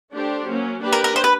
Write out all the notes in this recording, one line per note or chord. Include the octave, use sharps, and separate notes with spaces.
A3 D4 G4 C5
F#3 A#3 C#4
A#3 D4 G4 B4
A#4
A#4
C5
B4